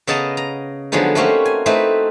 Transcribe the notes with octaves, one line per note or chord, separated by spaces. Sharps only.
C#3 B3 D#5 A5 A#5
A#5
D3 F3 F#3 G#3 B3 D#4
A3 A#3 C4 C#4 F#4 G4
G#5
A3 C4 D#4 E4 B4